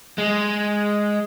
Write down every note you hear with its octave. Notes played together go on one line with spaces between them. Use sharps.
G#3